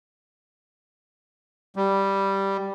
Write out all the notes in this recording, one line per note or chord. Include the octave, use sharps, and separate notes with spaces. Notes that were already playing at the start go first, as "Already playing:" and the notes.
G3